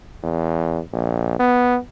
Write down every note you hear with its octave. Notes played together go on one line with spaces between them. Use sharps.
E2
A#1
B3